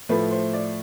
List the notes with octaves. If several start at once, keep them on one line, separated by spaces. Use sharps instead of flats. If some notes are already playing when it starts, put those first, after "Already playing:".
A2 F3 A3 B4
C5
D5